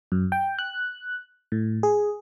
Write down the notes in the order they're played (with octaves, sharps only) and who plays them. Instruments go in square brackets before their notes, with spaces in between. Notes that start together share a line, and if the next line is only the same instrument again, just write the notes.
[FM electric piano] F#2
G5
F#6
A2
G#4